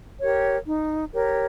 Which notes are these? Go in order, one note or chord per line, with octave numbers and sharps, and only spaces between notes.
G4 A#4 C#5
D#4
G4 A#4 C#5